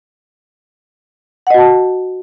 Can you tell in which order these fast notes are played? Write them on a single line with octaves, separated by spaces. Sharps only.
F#5 D#5 F#4 A5